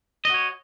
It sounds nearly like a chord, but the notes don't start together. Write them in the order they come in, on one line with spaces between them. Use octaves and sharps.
D#5 F#4 C#5